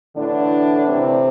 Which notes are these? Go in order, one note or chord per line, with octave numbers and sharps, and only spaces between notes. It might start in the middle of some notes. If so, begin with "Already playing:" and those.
A2 D3 E3 D4
C3 C4